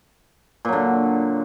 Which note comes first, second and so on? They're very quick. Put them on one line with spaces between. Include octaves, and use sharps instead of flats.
A#2 F#3 D3